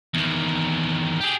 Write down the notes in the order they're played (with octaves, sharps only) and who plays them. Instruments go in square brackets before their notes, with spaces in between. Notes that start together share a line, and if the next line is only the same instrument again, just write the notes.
[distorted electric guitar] E2 D#3
G4 G#4